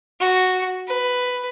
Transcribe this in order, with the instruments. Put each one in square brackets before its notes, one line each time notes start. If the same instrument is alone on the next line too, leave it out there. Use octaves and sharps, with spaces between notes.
[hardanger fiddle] F#4
B4